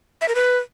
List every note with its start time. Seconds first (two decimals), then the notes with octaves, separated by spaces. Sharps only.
0.21 E5
0.28 A#4
0.35 B4